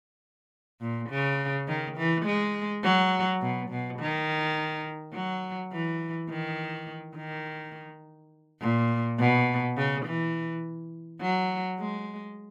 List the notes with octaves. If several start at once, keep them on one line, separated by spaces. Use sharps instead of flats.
A#2
C#3
D#3
E3
G#3
F#3
B2
B2
D#3
F#3
E3
D#3
D#3
A#2
B2
C#3
E3
F#3
G#3